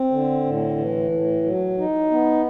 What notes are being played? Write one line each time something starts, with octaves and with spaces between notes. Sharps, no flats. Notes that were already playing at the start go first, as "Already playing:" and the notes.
Already playing: C4
D3
A2
E3
A2
F#3
D#4
B3